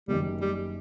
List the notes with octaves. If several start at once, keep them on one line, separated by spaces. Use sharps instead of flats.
F#1 F#2 D#3 G3
G3